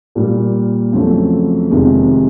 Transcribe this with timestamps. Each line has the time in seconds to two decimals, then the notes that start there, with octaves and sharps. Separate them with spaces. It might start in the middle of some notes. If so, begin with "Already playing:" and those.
0.15 A#2 G3 A#3
0.93 F2 C#3 F#3 A3
1.71 F1 F2 C3 D#3 G#3